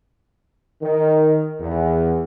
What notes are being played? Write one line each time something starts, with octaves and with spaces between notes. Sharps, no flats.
D#3
E2